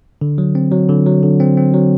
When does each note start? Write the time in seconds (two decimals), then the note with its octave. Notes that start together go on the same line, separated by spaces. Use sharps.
0.21 D3
0.38 F#3
0.55 C4
0.72 F#3
0.89 D3
1.06 F#3
1.23 D3
1.40 C4
1.57 C4
1.74 F#3